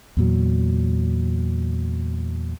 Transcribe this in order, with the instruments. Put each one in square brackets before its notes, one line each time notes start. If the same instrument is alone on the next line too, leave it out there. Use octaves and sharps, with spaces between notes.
[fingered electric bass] E2 A#2 F#3